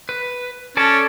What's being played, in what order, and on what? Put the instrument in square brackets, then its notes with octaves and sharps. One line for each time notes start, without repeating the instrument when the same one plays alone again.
[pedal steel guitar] B4
[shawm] C#4 [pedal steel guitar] A4 D5 A5